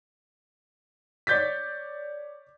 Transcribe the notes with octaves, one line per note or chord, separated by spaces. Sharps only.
C#5 D5 G6 A6 B6